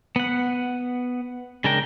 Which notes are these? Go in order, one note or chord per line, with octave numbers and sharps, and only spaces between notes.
B3 F#5
C#3 G#3 D4 A#4 G5